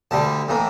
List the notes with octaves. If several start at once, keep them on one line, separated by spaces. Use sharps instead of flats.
D2 D3 G3 A5
A2 E3 A#3